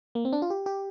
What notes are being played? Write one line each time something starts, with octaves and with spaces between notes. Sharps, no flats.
A#3
C4
D4
F4
G4
G4